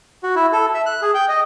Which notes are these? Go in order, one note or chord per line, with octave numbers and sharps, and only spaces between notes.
F#4
E4
A4
E5
F#6
G#4
G5
D#5